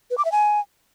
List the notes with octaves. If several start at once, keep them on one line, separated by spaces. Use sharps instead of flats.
B4
D6
E5
G#5